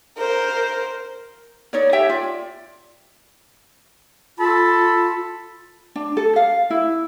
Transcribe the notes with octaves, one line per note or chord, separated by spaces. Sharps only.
A#4 C5
D#4 C#5 D5
G4 C#5 E5 G5
F4 D5
F4 A4 A5 B5
D4
A4
F5
E4